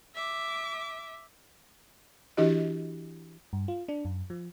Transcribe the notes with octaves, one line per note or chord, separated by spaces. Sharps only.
E5 D6
E3 D4 E4 F#4 G4 D#5
G2
F4
D4
F#2
F3